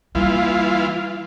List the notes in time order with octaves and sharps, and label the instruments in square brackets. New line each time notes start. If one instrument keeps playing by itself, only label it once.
[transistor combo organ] E3 F4 [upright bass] G3 A#3